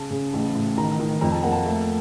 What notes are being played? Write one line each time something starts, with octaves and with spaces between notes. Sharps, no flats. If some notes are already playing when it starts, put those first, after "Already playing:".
Already playing: C#3 A5
C#3
A1
A2
D#3 A#5
D#3
F2 A#5
A5
A#3 F#5
A5
A3